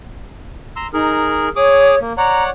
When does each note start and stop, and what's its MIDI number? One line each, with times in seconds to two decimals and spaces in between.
0.76 0.87 82
0.76 0.87 84
0.76 0.87 88
0.93 1.49 63
0.93 1.49 68
0.93 1.49 70
1.56 1.95 68
1.56 1.99 73
1.56 1.95 86
1.56 1.95 87
2.01 2.13 58
2.18 2.50 73
2.18 2.50 74
2.18 2.50 78
2.18 2.44 82